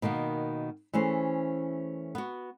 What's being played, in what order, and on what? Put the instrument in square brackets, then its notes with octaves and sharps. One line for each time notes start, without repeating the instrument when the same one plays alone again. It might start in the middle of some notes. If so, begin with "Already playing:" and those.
[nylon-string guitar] B2 D#3 A#3 B3
E3 A3 C#4 G#4 C5
B3 F#4